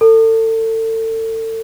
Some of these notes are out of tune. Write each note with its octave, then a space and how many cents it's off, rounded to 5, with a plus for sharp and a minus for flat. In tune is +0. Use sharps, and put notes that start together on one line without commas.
A4 +30